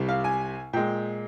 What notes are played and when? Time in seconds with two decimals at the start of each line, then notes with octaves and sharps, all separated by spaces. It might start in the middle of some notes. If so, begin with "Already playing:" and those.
Already playing: C2 C3 G3
0.09 F5
0.24 G#5
0.73 A#2 G#3 G5